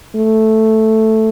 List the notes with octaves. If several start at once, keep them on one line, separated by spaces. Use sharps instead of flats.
A3